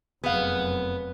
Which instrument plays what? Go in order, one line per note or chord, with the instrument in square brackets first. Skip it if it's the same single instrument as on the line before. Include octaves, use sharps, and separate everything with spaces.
[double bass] F1 F#2 [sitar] B3 [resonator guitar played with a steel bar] G#4 F5